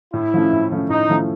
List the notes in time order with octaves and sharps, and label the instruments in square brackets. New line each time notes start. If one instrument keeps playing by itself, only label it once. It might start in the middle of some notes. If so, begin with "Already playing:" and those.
[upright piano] A2 [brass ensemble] E4
[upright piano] F3 A3 C#4
A2
F3 A3 C#4
[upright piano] A2 [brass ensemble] D#4
[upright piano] F3 A3 C#4